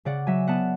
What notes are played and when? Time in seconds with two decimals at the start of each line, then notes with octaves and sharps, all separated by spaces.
0.05 C#3 D5 F#5
0.27 F#3 E5 G#5
0.47 B3 F#5 A5